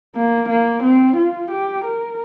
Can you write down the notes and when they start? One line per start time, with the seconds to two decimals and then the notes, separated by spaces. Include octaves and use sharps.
0.15 A#3
0.49 A#3
0.83 C4
1.16 F4
1.51 G4
1.84 A#4